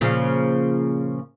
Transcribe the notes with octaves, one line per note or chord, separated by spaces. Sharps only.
A#2 C#3 F3